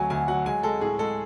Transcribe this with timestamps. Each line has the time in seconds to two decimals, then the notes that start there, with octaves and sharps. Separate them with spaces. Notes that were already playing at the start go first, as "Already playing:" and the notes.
Already playing: D2 F#3 A3 G#5
0.10 D2 G#5
0.28 F#3 F#5
0.46 G#3 G#5
0.63 G#3 A4
0.81 A2 G#4
0.99 G#3 A4